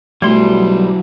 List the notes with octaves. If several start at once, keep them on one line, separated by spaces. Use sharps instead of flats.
B1 F#3 G3 A3 E4 C6